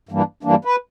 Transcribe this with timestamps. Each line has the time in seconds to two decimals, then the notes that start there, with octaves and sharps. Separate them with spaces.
0.09 G2 E3 G3 A#3 D4
0.43 G2 E3 G3 A#3 D4
0.65 B4